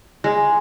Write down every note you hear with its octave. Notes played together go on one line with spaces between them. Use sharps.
G#3